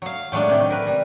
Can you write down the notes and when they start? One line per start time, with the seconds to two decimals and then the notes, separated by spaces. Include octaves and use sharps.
0.02 F#3 F5
0.32 A2 F#3 G#3 D4
0.49 C3 D#3
0.70 A#4 B4
0.87 G3